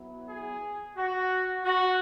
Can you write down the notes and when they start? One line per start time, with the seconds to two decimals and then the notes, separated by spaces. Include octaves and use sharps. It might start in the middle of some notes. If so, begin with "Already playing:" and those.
Already playing: F#3 B3 E4
0.27 G#4
0.96 F#4
1.65 F#4